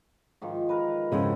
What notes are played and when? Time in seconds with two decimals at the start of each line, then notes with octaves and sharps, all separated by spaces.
0.42 G#2 D#3 F3
0.69 A#4 B4
1.12 F2 G#2 C#3 E4 C5 F#5